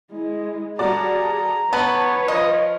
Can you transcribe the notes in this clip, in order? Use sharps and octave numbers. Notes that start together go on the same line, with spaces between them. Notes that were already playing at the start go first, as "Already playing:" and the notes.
G#3 E4
G3 F#4 G#4 A4 D5 A#5
B3 B4 C#5 A5 F#7
F3 D#5